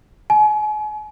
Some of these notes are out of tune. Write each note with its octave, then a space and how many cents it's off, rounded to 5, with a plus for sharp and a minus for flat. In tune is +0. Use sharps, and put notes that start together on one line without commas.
G#5 +35